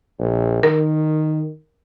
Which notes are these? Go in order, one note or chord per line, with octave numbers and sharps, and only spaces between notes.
A#1
D#3 A#4